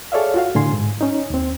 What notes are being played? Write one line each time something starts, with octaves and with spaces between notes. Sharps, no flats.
G#4 A4 C#5 D5 E5 F5
F4 F#4 F5
A2 D3 G#5 C6
G#2
C#4 D#4
D#2 C4